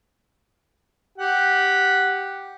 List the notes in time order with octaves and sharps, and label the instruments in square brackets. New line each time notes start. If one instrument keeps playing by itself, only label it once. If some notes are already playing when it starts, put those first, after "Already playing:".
[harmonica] G4 F#5